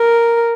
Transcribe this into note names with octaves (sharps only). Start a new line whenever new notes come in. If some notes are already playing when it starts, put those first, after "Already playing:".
Already playing: A#4